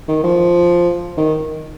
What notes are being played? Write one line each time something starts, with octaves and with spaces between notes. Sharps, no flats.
D#3
F3
D#3